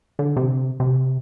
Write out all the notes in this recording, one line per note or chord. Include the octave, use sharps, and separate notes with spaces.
D3
C3
C3